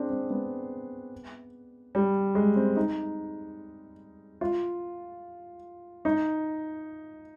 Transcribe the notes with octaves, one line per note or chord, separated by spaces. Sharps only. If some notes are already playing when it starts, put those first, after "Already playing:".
Already playing: C4 D4 G#4
C4
B3
G3
G#3
C4
D#4
F4
D#4